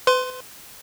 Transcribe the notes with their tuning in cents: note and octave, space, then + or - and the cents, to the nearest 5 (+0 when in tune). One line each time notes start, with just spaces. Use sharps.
B4 +35 C6 +0